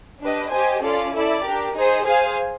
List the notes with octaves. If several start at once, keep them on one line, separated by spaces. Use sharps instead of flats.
D4 G4 B4 D#5
G4 C5 D#5 G#5
C#4 F4 A4 D5
E4 A4 D5
D4 G4 A#4
D#4 G#4 C5
G#4 C5 F5 G#5